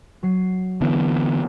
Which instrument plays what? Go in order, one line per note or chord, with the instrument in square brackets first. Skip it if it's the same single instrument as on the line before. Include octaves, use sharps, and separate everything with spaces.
[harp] F#3 C7
[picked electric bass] D3 E3 B3 [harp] E5